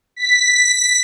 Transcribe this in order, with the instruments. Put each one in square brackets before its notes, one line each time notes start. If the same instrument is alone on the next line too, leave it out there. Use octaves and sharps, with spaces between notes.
[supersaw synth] B6